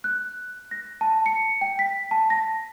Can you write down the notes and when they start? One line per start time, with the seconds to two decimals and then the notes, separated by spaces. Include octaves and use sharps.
0.04 F#6
0.71 A#6
1.01 A5
1.26 C#7
1.61 G5
1.79 B6
2.11 A5
2.30 A#6